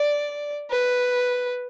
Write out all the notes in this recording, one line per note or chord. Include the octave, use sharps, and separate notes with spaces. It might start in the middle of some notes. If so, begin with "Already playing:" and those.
Already playing: D5
B4